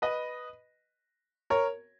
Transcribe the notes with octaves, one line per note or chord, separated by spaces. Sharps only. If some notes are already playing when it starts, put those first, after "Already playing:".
B4 D#5
A#4 C#5